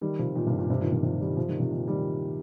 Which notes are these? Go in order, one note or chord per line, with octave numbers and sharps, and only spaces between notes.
D#3 G3
C3 F3
A#2 D#3
G2 C3
A#2
G2 C3
A#2 D#3
G2 C3
C3 F3
D#3 G3
C3 F3
D#3 G3
C3 F3
A#2 D#3
D#3 G3